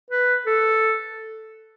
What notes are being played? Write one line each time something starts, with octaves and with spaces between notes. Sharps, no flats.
B4
A4